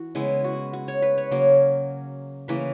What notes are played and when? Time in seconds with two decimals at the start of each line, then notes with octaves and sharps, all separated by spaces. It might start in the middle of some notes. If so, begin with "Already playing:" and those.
Already playing: E3 F#4
0.15 C#3 G#3 B3 E4
0.44 F#4
0.73 F#4
0.88 C#5
1.02 B4
1.18 C#5
1.31 C#3 F#3 A#3
2.48 C#3 E3 A#3 B4